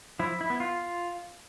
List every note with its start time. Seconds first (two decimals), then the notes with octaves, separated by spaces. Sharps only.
0.19 F3 E4
0.41 E4
0.50 B3
0.60 F4